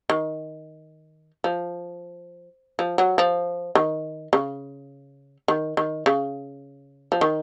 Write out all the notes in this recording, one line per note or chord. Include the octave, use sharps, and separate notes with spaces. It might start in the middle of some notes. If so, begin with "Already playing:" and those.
D#3
F3
F3
F#3
F3
D#3
C#3
D#3
D#3
C#3
F3
D#3